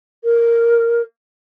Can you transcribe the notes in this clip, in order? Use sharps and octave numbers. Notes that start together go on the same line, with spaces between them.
A#4